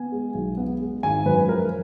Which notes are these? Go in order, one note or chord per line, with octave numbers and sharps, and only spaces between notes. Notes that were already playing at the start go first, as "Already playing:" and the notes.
Already playing: B3 G#5
G#3
B1
B3
G#3
G#1 G#5
F#2 B4
F3 A#4